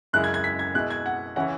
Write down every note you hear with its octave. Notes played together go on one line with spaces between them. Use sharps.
F#2 C#3 G#3 E4 F#6
G#6
G#6
B6
G#6
B2 G#3 E4 F#6
G#6
F#5
C#3 E3 C#4 E4 F#5